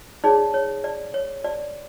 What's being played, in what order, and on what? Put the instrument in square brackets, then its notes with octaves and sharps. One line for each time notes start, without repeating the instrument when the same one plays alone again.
[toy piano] D#4 G#4 C#5 D5
C#5
D5
C#5
D5